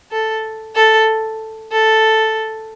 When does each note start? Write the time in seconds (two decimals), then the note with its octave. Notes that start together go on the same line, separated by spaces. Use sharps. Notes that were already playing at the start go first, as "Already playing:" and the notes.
0.12 A4
0.76 A4
1.72 A4